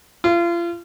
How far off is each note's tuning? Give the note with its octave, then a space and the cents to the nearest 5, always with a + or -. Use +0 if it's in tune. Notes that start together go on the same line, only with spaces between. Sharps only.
F4 -35